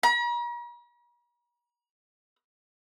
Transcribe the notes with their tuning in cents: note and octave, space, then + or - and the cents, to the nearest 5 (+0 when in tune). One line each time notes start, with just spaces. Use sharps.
A#5 +45